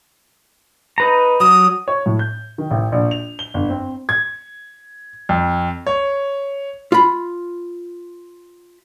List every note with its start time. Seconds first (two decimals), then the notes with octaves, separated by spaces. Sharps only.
0.98 D#4 B4 A#5
1.40 F#3 D#6
1.88 C#5
2.06 A2
2.19 G6
2.58 D#3
2.71 A1
2.92 A#1
3.11 F7
3.39 G7
3.54 G1
3.69 C4
4.09 G#6
5.29 F2
5.87 C#5
6.92 F4 B5